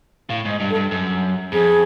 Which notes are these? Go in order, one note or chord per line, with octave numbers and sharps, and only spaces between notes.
A2 F5
G#2 D#5
G2
A4
G2
F#2
F2 G#4